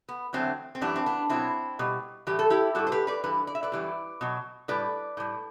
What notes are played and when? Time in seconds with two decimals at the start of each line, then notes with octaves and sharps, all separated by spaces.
0.09 B3
0.33 E2 D3 F#3 A3 C4
0.75 C4
0.81 F#2 E3 G3 B3 D4
0.96 C4
1.06 B3 D4
1.29 B2 F#3 C4 E4
1.79 B2 G3
2.27 A2 E3 G3 G4
2.39 A4
2.50 E4 G4
2.75 A2 G3 F#4 A4
2.87 C5
2.92 G4 B4
3.07 B4 D5
3.24 G2 E3 B4
3.47 D5
3.55 E5
3.63 B4 D5
3.72 F#2 E3 G3
4.21 B2 F#3
4.68 A2 G3 B4 D5
5.17 A2 G3